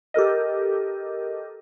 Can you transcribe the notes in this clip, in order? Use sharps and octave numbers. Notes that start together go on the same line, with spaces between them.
G4 A4 A#4 D#5